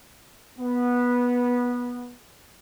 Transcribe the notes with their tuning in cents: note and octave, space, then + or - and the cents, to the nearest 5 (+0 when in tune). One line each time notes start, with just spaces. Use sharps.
B3 -15